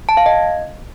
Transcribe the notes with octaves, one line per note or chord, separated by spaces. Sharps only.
A5
F5
D#5